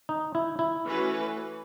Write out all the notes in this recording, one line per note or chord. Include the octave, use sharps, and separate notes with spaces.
D#4
E4
E4
E3 A3 C#4 F#4 B4